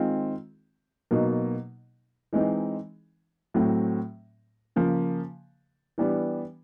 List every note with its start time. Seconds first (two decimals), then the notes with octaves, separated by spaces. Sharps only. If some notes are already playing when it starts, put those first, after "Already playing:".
Already playing: D#3 G#3 C4 F4
1.11 B2 F#3 A#3 D#4
2.33 E3 G#3 C4 D#4
3.54 A2 F#3 A3 C4
4.76 C#3 F3 A#3
5.98 E3 G3 B3 D4